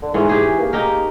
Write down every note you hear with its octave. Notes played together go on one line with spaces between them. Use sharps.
D3
G#2 E3 C#4
G4 G#4
A#3
D#4 G4 A#4